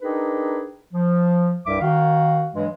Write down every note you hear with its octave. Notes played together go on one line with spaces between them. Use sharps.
D4 D#4 G4 G#4 A#4 B4
F3
C2 G2 G3 E5 D6
D#3 F#4 F5
G2 E3 F#3 G#3